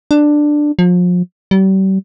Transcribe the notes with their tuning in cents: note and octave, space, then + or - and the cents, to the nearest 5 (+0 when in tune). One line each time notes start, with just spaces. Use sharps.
D4 +10
F3 +35
G3 -40